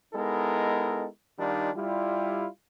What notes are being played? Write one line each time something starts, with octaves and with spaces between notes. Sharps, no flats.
G#3 B3 D#4 E4 A4 A#4
D#3 G3 D4 D#4 F4
G3 E4 F4